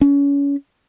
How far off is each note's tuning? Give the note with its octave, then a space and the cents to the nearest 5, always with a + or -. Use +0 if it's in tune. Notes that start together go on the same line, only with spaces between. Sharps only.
C#4 +30